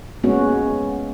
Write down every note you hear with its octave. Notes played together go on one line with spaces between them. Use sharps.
G#3 A#3 B3 C#4 F#4